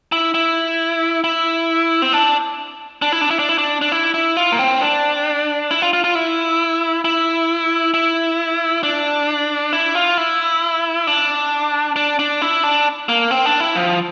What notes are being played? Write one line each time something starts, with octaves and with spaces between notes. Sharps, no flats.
E4
E4
E4
C4
D4
D4
E4
D4
E4
D4
E4
D4
D4
E4
E4
F4
A#3
C4
D4
E4
F4
F4
F4
E4
E4
E4
D4
E4
F4
E4
D4
D4
D4
E4
D4
A#3
C4
D4
E4
F3